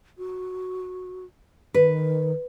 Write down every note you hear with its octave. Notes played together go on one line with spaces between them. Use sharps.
F#4
D#3 B4